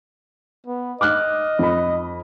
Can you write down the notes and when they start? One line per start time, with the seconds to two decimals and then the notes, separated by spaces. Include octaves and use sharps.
0.66 B3
1.01 D#5 D6 F6 F#6
1.59 F2 B5